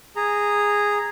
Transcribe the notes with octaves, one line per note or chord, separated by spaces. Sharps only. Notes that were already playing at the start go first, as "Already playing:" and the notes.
G#4 A#5